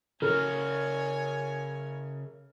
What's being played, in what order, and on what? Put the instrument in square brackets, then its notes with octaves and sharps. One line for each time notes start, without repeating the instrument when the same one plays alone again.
[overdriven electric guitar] C#3 F#4 [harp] A#4 [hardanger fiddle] C#5 G#5